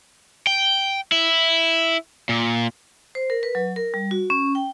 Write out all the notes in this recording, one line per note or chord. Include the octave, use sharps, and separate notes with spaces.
G5
E4
A#2
C5
A#4
B4
F#3
A#4
G3
F#4
C#4
G5